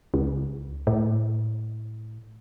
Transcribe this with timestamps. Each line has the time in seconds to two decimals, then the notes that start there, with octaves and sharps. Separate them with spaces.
0.14 C#2
0.87 A2